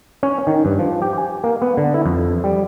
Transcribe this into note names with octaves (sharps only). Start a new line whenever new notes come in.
C#4
D#3
G2
F3
G4
G#5
A#3
B3
D3
E4
F2
G3